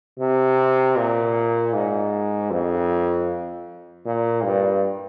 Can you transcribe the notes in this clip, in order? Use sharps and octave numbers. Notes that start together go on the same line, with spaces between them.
C3
A#2
G#2
F2
A#2
G2